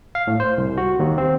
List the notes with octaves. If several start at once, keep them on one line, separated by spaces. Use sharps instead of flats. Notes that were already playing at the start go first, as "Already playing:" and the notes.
F5
A2
C5
C2
F#4
D#2
C4